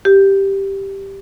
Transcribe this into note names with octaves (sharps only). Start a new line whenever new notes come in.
G4